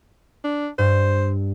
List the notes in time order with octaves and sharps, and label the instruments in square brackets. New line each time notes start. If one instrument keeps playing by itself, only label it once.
[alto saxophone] D4
[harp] G2 [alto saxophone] C5